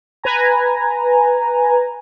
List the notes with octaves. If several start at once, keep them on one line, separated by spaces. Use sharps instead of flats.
B4 G#5 A#5